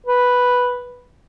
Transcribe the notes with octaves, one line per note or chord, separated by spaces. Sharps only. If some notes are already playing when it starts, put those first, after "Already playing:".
B4